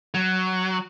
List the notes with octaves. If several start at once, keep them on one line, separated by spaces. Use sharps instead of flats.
F#3